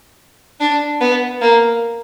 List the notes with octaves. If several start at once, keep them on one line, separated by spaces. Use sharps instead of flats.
D4
B3
A#3